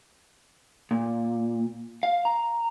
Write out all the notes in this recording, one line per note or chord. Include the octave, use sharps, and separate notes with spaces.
A#2
F5
A#5